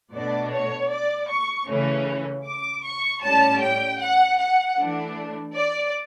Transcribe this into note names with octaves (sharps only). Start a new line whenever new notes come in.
B2 A3 D4 D5
C#5
D5
C#6
C#3 E3 A3 C#4
D6
C#6
A2 G3 C#4 A5
G5
F#5
F#5
E3 A3 D4
D5